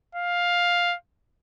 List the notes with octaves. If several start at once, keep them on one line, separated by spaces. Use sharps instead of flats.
F5